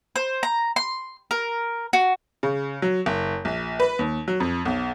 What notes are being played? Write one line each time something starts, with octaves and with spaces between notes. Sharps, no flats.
C5
A#5
C6
A#4
F#4
C#3
F#3
F#1
A#1
B4
D#2
F#3
F2
B1